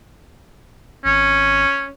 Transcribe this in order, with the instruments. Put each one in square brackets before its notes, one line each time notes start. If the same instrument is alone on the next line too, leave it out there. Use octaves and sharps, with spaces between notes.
[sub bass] G#1 [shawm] C#4